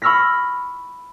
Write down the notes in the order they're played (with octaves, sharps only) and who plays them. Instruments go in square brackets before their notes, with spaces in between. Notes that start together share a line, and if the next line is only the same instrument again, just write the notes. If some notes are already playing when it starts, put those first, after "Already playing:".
[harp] B5 C#6 E6 F6 A#6 B6